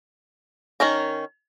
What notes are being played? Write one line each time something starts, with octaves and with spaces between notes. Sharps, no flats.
D#3 C#4 A#4 A#5